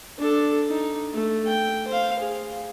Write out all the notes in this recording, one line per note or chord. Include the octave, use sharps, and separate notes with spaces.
D4 A4
D#4
A3
G5
C5 F5
G#4